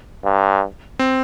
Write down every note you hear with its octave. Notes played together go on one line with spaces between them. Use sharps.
G2
C4